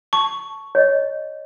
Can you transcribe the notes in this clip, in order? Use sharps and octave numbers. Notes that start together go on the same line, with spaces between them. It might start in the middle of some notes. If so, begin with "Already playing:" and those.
A5 C#6
C#5 D#5